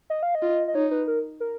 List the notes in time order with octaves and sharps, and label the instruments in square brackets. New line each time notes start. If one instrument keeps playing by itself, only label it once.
[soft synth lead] D#5
F5
D#5
[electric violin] F4
[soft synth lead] D#5
[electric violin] D#4 [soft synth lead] C#5
[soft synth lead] B4
A#4
A#4